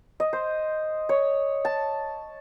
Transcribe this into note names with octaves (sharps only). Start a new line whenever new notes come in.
D#5
C5
C#5
A5